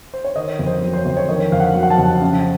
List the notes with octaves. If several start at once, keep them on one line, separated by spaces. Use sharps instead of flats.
C5
C#5
D#3 D#5
F2
C5
F#3
C5
C#5
F2
C#5
D#3 D#5
F2 F5
F#5
F#3
F#5
A5
F2
C#3